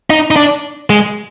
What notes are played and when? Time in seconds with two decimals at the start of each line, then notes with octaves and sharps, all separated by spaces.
0.10 D#4
0.31 D#4
0.36 D4
0.90 G#3